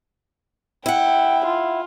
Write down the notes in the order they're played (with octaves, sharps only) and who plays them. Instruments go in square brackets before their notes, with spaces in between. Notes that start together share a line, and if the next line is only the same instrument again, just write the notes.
[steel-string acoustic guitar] E4 F#5 [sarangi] G5
[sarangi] F4